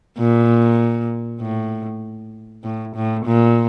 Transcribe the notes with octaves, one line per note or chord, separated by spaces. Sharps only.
A#2
A2
A2
A2
A#2